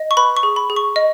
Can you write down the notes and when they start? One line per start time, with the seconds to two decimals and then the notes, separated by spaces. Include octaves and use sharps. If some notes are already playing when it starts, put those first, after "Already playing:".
Already playing: D#5
0.11 C#6
0.17 B4 B5
0.37 C#6
0.43 G#4
0.56 B5
0.70 G#4
0.76 C#6
0.96 D#5